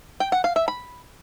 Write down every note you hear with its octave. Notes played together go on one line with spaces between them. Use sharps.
G5
F#5
F5
E5
B5